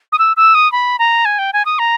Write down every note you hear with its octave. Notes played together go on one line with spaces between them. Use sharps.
D#6
E6
E6
D#6
B5
A#5
G#5
G5
G#5
D#6
A#5